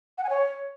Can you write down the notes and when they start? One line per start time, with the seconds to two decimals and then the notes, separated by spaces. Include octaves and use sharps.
0.18 F#5
0.24 G#5
0.29 C#5